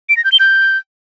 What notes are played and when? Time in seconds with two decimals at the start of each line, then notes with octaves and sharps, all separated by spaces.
0.09 D7
0.17 A#6
0.24 G6
0.32 G7
0.40 G6